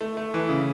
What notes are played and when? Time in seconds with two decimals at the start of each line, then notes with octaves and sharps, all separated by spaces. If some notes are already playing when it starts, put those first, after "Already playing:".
0.01 A3
0.17 A3
0.34 E3
0.49 C#3